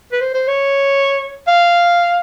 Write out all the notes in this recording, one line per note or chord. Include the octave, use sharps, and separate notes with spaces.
B4
C5
C5
C#5
F5